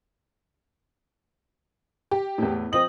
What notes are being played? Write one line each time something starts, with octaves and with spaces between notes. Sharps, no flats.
G4
E2 A2
F3 C4 D#5 F#7